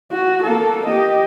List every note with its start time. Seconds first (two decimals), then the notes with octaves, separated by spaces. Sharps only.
0.12 F#4
0.43 A#3 A4
0.86 G4 D#5